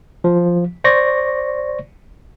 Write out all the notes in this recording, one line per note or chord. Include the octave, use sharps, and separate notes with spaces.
F3
C5 D5 C#6 A#6